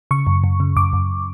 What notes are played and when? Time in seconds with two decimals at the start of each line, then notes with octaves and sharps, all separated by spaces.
0.11 C#3 C#6
0.27 F#2
0.44 F#2
0.60 C#3
0.76 F#2 D6
0.93 F#2